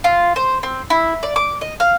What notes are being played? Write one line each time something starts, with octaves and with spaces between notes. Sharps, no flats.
F4
C5
C4
E4
D5
D6
D#5
F5